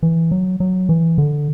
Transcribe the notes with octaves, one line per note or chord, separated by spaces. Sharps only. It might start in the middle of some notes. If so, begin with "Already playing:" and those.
E3
F#3
F#3
E3
D3